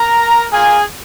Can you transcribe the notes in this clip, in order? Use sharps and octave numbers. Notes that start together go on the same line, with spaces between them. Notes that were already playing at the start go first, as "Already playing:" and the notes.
Already playing: A#4 A#5
A#3 F4 G#4 G#5